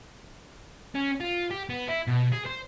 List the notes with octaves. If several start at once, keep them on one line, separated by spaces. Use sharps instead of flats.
C#4
F4
G4
B3
E4
B2
G#4
C5